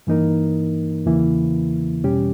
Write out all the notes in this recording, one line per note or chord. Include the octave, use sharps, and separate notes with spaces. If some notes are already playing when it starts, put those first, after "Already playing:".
G2 E3 A#3 D#4 A#4
E2 C#3 E3 A#3 E4
E2 B2 G3 C#4 G4